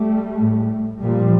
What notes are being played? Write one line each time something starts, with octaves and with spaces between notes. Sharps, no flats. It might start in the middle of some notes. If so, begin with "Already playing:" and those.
Already playing: G3 A3
A2
A#2 F3 G3